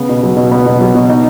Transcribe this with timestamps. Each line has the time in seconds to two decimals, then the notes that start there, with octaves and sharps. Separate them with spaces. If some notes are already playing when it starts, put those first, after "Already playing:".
Already playing: C#3 B3
0.09 B2
0.23 F#3
0.37 B2
0.52 B3
0.66 B2
0.80 F#3
0.95 B2
1.09 D#4